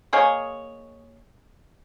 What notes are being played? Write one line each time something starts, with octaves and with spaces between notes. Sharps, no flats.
A#3 G#4 C#5 D#5